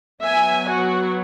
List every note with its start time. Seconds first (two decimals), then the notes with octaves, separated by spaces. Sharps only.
0.24 F#3 B3 E5 G#5
0.70 F#4